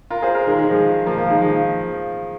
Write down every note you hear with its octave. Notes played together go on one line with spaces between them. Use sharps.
F4 A#4
G#4 C5
F4 A#4
D#3 G#3
D#3 G#3
F3
F3 A#3
F3 A#3
D#3 G#3
F3